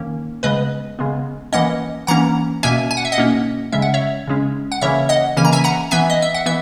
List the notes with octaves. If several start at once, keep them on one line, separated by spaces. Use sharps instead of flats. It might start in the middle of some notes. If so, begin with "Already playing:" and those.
Already playing: D#3 A#3 C#4
C#3 G#3 B3 B4 D#5
C#3 G#3 B3
E3 A#3 C#4 D#5 F#5
E3 A#3 C#4 F#5 A#5
B2 A#3 C#4 E5 G#5
G#5
F#5
E5
D#5 F#5
B2 A#3 C#4
C#3 G#3 C#4 E5
F#5
C#5 E5
C#3 G#3 C#4
F#5
C#3 E3 A#3 C#4 C#5 E5
D#5 F#5
C#3 E3 A#3 C#4 G#5
A#5
E5 G#5
F#5 A#5
E3 B3 E5 G#5
D#5
E5
F#5
E3 B3 E5